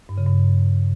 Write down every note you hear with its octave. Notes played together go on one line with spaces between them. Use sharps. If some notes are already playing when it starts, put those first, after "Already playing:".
G2
C#3
G2